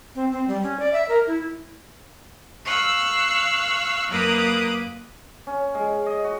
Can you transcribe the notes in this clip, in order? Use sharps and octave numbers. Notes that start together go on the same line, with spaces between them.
C4
C4
G3
C#4
D5
E5
A#4
E4
F5 C#6 E6 F#6
F#2 A#3 B4 D6 D#6 F#6
C#4
G#3
D#5
F#4